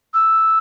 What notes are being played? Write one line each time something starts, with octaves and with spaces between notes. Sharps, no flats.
E6